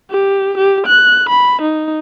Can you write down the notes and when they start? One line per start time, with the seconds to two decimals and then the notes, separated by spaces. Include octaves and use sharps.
0.11 G4
0.58 G4
0.87 F#6
1.30 B5
1.62 D#4